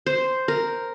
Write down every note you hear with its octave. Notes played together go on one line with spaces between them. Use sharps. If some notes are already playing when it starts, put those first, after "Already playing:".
C5
A#4